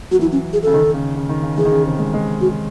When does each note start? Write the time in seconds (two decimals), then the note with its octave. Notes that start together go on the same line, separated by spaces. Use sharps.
0.11 F#3 F#4
0.19 E3 E4
0.26 F#3
0.32 C#4
0.53 G#4
0.63 C#3 A4
0.74 D#3
0.94 C#3
1.16 C#3
1.29 D#3
1.43 C#3
1.57 E3 G#4
1.65 D#3
1.71 C#3
1.86 C3
1.99 G#3
2.14 G#3
2.41 F#4